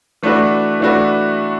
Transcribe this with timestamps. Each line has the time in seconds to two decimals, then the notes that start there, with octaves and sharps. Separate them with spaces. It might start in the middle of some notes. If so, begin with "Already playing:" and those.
0.23 E3 A3 D4 F#4 B4
0.80 E3 A3 D4 F#4 B4